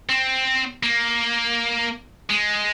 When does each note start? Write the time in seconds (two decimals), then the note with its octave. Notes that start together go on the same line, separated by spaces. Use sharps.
0.09 C4
0.83 A#3
2.30 G#3